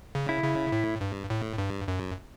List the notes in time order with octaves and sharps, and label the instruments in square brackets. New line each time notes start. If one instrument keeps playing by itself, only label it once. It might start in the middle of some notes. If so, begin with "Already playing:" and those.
[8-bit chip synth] C#3
[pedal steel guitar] E4
[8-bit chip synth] C#3
A2
G2
A2
G2
F#2